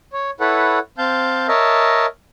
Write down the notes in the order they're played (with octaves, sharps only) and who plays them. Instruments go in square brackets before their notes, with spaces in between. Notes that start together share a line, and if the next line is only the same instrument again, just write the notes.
[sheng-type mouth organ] C#5
E4 A4 B4 C#5 F#5
C4 F5 A5 G6
A#4 C#5 D#5 E5 A5